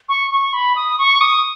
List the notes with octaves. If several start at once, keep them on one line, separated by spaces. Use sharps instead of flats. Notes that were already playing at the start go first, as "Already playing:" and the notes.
C#6
C#6
B5
D#6
C#6
D#6